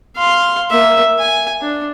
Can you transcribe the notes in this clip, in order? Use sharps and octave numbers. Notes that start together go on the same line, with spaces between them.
F5 C6
A#3 E5
G#5
D4